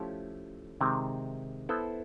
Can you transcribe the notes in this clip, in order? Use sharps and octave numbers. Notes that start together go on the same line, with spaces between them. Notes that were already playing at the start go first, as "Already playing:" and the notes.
Already playing: F3 A3 C#4 E4 G4
C3 D#3 G#3 C4
B3 E4 A4 C5